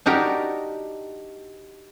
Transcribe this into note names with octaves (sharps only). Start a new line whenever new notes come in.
D4 D#4 F#4 G4 A#4